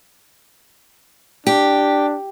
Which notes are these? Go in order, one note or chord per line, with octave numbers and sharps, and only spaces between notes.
D4 G4